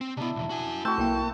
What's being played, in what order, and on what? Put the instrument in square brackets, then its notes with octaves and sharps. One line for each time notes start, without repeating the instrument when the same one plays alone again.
[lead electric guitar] C4
[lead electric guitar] C3 B3 [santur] D4 E4
[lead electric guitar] B1 E2
F#4 G#5
[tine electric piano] A3 E6 G6 [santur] C4 F#4 [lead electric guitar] A5
[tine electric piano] B1 E4 G5 [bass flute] A#3